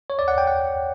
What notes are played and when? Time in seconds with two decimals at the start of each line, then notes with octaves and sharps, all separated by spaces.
0.10 C#5
0.19 D5
0.28 F#5
0.38 G5
0.47 F#5